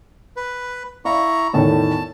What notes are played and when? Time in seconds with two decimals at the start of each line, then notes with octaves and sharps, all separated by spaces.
0.36 B4
1.05 E4 D5 F5 A#5 C#6
1.54 E2 A2 D#3 A5